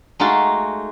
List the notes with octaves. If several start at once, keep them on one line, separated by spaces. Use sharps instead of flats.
G#3 A3 D#4 F#4 F5 A5